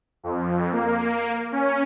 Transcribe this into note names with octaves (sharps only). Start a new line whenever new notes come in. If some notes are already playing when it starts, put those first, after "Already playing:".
F2
A#3
C#4